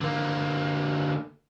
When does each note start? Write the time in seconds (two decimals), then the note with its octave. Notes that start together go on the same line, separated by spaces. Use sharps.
0.01 D3 A#3